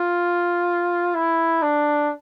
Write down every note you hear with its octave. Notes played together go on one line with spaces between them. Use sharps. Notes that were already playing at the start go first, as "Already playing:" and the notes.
Already playing: F4
E4
D4